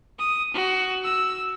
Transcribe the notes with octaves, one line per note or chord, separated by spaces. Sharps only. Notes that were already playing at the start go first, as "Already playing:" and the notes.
D#6
F#4
E6